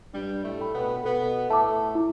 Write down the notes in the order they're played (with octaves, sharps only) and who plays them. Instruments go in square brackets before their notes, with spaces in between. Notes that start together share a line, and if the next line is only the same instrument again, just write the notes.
[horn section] G2 G3 [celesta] D4
[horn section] A2 A3
[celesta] A4 G5 B5
[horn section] B2 B3
[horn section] B2 B3 [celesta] A4
[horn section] A2 A3 [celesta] E5 A5 D6
[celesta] E4